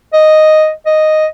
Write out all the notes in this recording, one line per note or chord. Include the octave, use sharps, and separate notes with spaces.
D#5
D#5